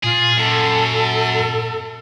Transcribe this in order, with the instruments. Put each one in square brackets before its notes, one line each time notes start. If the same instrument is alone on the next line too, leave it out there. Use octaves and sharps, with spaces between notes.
[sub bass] A#2 [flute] F4 [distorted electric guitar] G#4
[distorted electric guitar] F#2 [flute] A4